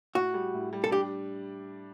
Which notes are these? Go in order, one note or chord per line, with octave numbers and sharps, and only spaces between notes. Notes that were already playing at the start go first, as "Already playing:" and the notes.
A2 F#4
G3
A2
G3
A4
D4 G4